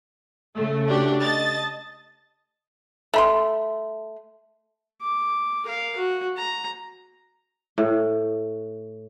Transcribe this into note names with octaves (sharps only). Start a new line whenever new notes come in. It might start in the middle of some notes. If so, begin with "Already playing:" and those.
C#3 A3
D4 F#4 G4
D#5 A5 A6
A3 B5 C6
D6
A#4 F5
F#4
A#5
A2